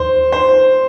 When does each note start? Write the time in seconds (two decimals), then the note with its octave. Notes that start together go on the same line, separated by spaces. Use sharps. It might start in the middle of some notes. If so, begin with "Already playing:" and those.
Already playing: D#2 C5
0.32 C5